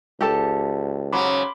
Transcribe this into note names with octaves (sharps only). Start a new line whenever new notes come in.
C#2 G4 A4 A5
G#2 C#3 F#3 B5 C6 D6